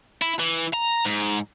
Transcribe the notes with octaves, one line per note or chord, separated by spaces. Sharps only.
E4
E3
A#5
G#2